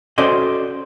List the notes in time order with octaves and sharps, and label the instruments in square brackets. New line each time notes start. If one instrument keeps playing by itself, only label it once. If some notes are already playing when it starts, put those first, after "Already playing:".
[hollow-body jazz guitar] C#4 F#4 A4 C5 D5 D#5